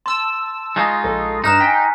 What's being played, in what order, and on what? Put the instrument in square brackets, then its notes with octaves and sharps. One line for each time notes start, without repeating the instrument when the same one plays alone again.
[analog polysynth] A5 E6 [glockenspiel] C6
[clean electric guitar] G#3 D#4 F4 [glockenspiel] C#6
[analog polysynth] A#1 A4
[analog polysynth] G2 E7 [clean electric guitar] D#4 [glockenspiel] A#5 F6 F#6
[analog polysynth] G5 [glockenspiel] G#5 A6 B6